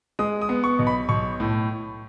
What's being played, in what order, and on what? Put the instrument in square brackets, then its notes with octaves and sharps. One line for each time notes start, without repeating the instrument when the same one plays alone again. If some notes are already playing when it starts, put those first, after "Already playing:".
[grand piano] G#3 D#6
D#6
B3
C#6
B1
B5
B1 C#6
A2